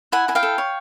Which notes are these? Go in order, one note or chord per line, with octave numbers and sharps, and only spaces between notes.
E4 F#5 G#5
E4 G#5
F5 G5
A4
C#5